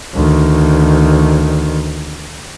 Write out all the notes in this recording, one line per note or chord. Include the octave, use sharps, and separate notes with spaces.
D2 D#3